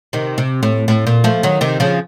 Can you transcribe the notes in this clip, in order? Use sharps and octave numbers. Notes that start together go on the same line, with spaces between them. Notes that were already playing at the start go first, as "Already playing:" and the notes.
C3 D#3
C3
A2
A2
A#2
F3 A3
D#3 F#3
C3 D#3
C#3 F3